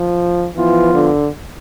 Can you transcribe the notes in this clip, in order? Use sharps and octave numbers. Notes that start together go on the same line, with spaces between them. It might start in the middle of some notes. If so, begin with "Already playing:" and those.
Already playing: F3
E3 F3 B3 F4
D3